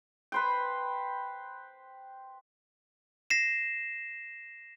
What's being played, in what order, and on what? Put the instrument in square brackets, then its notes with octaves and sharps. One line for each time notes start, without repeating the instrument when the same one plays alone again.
[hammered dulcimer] B4 C5 G5
[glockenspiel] A#6 C7 E7